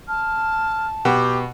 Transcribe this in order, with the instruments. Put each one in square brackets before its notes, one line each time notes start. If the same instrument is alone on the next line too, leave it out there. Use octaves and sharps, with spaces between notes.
[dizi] A5 [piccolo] F6
[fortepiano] B2 [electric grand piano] G4 F#5 G5 [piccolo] D6